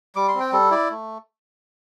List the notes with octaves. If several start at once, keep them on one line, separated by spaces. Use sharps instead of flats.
G3 D6
C6
C4
G5
G3 A4
E4 D5
A3